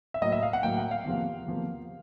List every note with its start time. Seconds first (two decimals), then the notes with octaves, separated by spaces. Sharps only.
0.14 E5
0.22 A2 F#3 A#3 D#5
0.32 E5
0.43 F5
0.53 F#5
0.63 A2 F#3 A#3 G5
0.77 F#5
0.91 F5
1.05 E2 C3 F3 A#3
1.47 E2 C3 F3 A#3